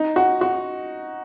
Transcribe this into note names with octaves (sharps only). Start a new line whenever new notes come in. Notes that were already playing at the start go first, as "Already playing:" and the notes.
Already playing: D#4
F#4
F#4